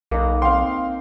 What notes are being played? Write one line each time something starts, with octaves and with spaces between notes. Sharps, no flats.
B1 A#3 D#4
C4 F5 G5 C6